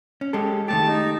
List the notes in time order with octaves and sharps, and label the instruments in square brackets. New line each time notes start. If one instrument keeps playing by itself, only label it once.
[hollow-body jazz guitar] C#4
G#3 G4 A4
[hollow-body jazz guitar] D#3 A3 G4 [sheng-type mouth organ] A5
[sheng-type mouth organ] D#4